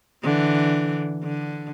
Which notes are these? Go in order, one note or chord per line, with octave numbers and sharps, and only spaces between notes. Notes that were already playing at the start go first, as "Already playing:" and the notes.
D3 E3
D3